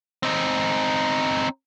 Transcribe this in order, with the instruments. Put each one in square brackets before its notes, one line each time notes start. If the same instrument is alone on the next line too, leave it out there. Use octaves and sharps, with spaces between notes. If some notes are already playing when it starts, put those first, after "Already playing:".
[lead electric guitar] C4 D#4